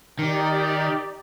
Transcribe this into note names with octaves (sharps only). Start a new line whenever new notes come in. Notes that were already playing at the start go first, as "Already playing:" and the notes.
D#3 D#4 G4 D5